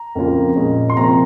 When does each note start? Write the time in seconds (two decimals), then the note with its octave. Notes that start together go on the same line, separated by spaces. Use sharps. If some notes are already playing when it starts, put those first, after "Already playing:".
Already playing: A#5
0.15 F2 C#3 F3 A#3 F4
0.56 A#2 G#3 C#4
0.90 C6
0.96 C3 F3 A#3 F4 A#5